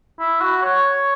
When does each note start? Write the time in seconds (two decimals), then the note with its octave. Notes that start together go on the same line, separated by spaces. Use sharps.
0.19 E4
0.41 F#4
0.62 C#5